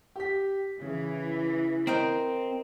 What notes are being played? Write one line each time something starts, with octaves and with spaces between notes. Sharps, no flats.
G4 B6
C#3 E3
C4 A#4 D#5 G5